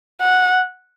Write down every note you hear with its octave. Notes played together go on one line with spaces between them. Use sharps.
F#5